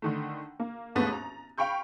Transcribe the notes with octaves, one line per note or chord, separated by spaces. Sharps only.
D3 D#3 A3
A#3
A1 D#2 G#2 A3 B3 A6
A#5
F5 G5 B5 C#6 G6